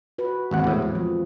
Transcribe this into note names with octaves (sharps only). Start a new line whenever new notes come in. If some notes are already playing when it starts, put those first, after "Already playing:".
F#4 B4
G#1 D#2 G#3 C4 F#5
E2 A2
E2
F3